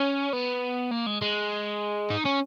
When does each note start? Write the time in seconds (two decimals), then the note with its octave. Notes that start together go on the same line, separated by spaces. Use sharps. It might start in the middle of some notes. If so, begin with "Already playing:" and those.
Already playing: C#4
0.33 B3
0.91 A#3
1.06 G#3
1.22 G#3
2.10 D#4
2.25 C#4